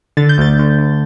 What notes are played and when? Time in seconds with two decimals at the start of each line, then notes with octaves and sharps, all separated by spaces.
0.17 D3 A6
0.29 G6
0.38 D2 A6
0.59 D2
0.79 D2